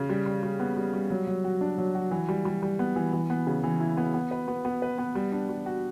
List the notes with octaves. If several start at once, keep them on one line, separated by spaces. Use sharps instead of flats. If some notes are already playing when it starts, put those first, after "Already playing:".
Already playing: C#3
G3
G3
G3
B3
G3
G3
F#3
F#3
F#4
D4
F#3
F#4
E3
G3
G3
G3
B3
E3
E3
B3
C#3
E3
E4
B3
B3
B4
B3
B3
B4
B3
G3
D4
G3
F#4